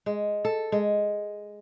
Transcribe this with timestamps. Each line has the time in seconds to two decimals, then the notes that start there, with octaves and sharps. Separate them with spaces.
0.06 G#3
0.45 A4
0.72 G#3